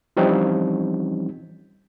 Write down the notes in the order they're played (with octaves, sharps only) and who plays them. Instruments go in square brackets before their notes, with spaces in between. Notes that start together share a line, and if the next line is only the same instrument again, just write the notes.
[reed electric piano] E3 F3 G3 C4 C#4 D#4